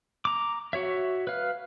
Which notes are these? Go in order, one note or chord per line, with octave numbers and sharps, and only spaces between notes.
A#5 D6
F#4 C#5 E5
B4 F5